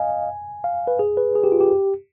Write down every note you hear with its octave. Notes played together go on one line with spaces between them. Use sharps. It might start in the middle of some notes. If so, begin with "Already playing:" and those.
Already playing: D#5 F5 G#5
F5
B4
G#4
B4
G#4
G4
F4
G4